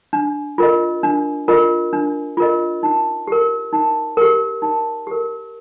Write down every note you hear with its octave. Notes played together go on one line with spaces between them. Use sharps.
D4
F4 A#4 D#5
D4
F4 A#4 D#5
D4
F4 A#4 D#5
D#4
G4 A#4
D#4
G4 A#4
D#4
G4 A#4